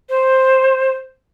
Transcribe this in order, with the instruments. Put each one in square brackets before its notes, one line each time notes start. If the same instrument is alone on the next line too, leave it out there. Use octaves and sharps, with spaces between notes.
[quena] C5